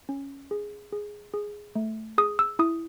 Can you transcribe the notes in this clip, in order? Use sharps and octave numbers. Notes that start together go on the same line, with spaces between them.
C#4
G#4
G#4
G#4
A3
G#4 D#6
E6
E4 D#6